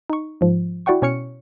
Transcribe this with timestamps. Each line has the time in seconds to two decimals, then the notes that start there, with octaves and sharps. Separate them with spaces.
0.10 D#4 C#6
0.41 G#2 F3
0.86 E4 F#4 D5 F#5 G5 C#6
1.02 B2 C#4 C#5 C#6 F6 C#7